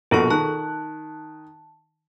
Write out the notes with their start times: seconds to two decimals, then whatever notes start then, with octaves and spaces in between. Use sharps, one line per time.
0.11 A#1 B2 G#4 A4 F#5 C#6
0.30 D#3 A5 F#6